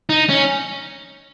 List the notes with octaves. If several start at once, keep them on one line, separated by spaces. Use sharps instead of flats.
D#4
C#4